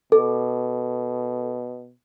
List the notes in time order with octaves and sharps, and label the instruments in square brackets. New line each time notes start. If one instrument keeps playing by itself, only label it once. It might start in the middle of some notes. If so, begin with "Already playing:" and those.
[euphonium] B2 [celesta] A4